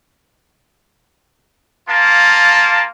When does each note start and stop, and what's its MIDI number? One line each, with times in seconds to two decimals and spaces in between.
1.88 2.84 58
1.88 2.84 65
1.88 2.84 81